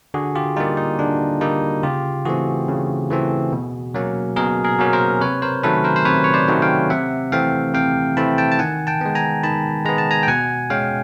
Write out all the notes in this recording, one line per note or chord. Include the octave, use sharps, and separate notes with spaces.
D3 F#4 G#4
F4 G4
G3 A#3 D#4 F4
D#4
D3 D4
G3 A#3 D#4
C#3 F4 G4
E3 A3 C4 F#4 G#4
C#3
E3 A3 C4
B2
F#3 A#3 C#4
B2 G#4 A#4
G#4 A#4
F#3 A#3 C#4
A#4 C5
C3 B4 C#5
A#4 C5
D#3 F#3 A3 C#4 A4 B4
A#4 C5
C5
C3 B4 C#5
C#5
C5 D5
D#3 F#3 A3 C#4
F5 G5
C3 E5 F#5
E3 A3 C4 F5 G5
C3 F5 G5
E3 A3 C4 A5 B5
G5 A5
A5
D#3 F#5 G#5
G5 A5
G#3 B3
G#5 A#5
D#3 A5 B5
G#3 B3 A#5
A5
G#5 A#5
G5
B2 F#5 G#5
G#3 C#4 F5 G5